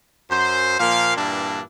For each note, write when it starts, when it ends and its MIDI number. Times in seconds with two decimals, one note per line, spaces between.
0.31 0.76 42
0.31 0.76 72
0.80 1.16 46
0.80 1.16 53
0.80 1.16 58
0.80 1.16 77
1.17 1.62 43
1.17 1.62 46
1.17 1.62 52
1.17 1.62 58
1.17 1.62 62